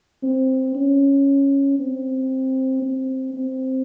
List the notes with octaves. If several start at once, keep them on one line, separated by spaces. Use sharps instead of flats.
C4
C#4
C4
C4
C4